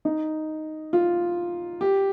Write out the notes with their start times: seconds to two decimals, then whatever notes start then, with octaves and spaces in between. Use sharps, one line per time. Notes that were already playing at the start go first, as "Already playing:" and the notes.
0.05 D#4
0.93 F4
1.81 G4